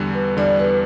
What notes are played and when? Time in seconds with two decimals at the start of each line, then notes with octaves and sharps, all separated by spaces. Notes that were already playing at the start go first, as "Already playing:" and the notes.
Already playing: E2 D3 G3
0.15 B4
0.37 E2 D3 G3 D5
0.59 B4